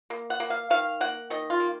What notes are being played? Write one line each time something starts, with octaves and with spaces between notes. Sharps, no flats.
A#3
F#5
A#3
F5
D#3 F5
A#3 F#5
D#3 D#5
F4
A#3